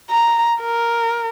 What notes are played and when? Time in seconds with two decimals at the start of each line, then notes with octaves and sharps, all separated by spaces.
0.10 A#5
0.61 A#4